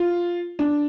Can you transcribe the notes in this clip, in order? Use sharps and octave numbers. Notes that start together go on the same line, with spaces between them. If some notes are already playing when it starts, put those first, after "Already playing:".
Already playing: F4
D4